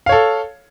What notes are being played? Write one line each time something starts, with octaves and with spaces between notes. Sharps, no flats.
A4 C#5 F5